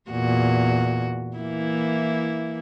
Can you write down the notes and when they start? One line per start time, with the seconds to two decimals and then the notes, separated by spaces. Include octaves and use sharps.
0.11 E2 A#2 F#4
1.38 E3 A#3 E4